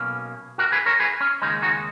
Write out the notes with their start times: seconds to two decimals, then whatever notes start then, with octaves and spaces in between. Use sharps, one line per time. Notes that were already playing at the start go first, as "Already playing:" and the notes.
Already playing: B1 B2 A#3 C#4
0.58 F#4 A#4
0.72 G#4 B4
0.86 A#4 C#5
1.00 G#4 B4
1.21 C#4
1.41 D#2 C#3 G#3 C#4 D#4
1.62 D#4 F#4